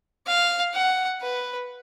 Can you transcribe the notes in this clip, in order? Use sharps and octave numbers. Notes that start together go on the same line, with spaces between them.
F5
F#5
B4